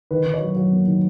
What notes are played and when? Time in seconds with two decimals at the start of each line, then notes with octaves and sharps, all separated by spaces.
0.11 D#3 B4
0.26 D#3
0.34 C#5
0.41 F#3
0.56 F#3
0.73 A#3
0.87 D#3